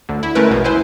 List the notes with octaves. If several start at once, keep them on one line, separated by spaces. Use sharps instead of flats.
D2 D3
E4
G#3 A3 C#4 A#4 B4
A#1 E2 B2
E4 B4 C5 G#5